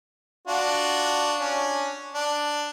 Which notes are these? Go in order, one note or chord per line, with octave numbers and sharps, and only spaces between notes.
D4 F4 F#4
C#4 D4
D4